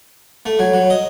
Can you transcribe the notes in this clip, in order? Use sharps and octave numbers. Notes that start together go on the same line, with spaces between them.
A3
F#3
F#3
D#5